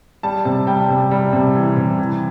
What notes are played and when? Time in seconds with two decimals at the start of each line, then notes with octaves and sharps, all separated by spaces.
0.23 G3 A5
0.45 C3
0.67 G3 G5
0.89 C3
1.11 G3
1.33 C3
1.55 E3
1.77 C3
1.99 E3